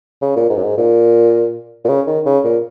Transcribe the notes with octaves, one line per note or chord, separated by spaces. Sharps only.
C#3
A#2
G#2
F#2
G#2
A#2
A#2
C#3
D#3
C#3
A#2